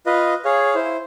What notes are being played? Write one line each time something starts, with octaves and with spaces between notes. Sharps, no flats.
F4 B4 D#5
G#4 C#5 F5
E4 C5